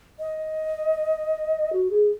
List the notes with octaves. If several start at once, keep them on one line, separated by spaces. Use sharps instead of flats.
D#5
F#4
G#4